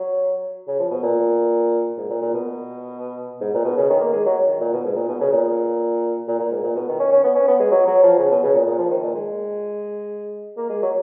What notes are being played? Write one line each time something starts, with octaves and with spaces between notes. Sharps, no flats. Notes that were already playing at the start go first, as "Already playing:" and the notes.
Already playing: F#3
C#3
F3
B2
A#2
G#2
A#2
A#2
B2
G#2
A#2
B2
C#3
D#3
A#3
G#3
F#3
D#3
A#2
B2
G#2
A#2
B2
C#3
A#2
A#2
A#2
G#2
A#2
B2
D#3
C#4
C#4
B3
C#4
B3
G#3
F#3
F#3
F3
C#3
B2
C#3
A#2
A#2
F3
D#3
A#2
G#3
A#3
G#3
F#3